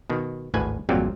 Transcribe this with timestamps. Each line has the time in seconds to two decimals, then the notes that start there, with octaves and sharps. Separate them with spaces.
0.10 B2 D#3
0.54 G#1 D2 A2 B4 G#5
0.89 G#1 F2 A#2 F#3 G3 C4